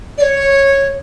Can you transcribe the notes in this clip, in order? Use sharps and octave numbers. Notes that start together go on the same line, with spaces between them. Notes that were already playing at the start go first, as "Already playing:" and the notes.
D5
C#5